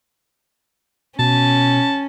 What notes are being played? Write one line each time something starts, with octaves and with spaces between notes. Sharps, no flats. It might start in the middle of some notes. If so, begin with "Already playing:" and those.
B2 C#4 A5